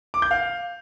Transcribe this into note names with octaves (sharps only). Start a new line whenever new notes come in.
D6
G6
F5